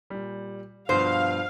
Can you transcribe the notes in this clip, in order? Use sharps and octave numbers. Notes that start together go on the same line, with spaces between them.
A#2 G3
G2 B2 F3 C5 F5